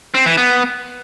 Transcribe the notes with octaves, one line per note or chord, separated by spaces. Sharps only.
C4
E3
B3